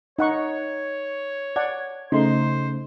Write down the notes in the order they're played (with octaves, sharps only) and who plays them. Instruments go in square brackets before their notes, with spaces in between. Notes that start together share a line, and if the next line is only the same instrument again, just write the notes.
[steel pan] D#4 F#5 C#6 [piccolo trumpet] C#5
[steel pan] D5 F#5 A5 [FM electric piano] G#6
[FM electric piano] C#3 A3 [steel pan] D#4 C6 [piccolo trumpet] C5